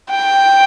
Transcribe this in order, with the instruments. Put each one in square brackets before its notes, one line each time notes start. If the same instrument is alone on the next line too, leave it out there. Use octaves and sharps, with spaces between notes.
[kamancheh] G5